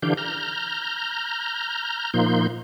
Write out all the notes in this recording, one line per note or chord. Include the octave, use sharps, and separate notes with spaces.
D3 E3 D4 G4 F5 G6
A#5 F6 G6
A#2 F3 A#3 D#4 C6 G6